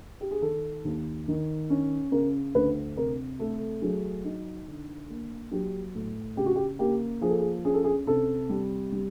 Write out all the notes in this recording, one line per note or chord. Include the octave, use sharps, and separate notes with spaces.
G4
G#4
D#3 A4
D#2
D#3
C#4
C#3 A#4
D2 B4
C3 A#4
A3 A4
F#3 G#4
D#4
D3
A#3
F#3 G4
A2
C#3 G4
F#4
G4
A#3 G4
F3 G#4
A4
G#4
C#4 G#4
A4
G#4
C3 A4
G3
G3